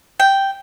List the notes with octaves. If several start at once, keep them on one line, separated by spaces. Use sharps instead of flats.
G5